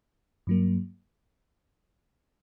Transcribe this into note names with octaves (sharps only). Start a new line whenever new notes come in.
G2 F#3 A#3